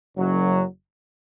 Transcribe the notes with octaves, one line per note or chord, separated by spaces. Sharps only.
F#1 F#2 F#3